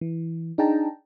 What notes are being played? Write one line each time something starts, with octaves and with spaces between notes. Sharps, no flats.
E3
D4 D#4 G#4 G5 A5 A#5